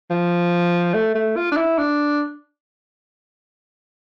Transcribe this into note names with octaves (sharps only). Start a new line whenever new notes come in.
F3
A3
A3
F4
D4
E4
D4